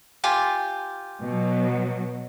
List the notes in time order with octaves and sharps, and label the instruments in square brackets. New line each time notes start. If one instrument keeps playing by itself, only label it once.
[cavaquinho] F4 G4 G#5
[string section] B2 F#3